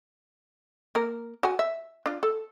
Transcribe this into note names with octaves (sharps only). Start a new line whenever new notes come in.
A#3 A#4
F#4 F#5 G#5
E5
D4 F4
A4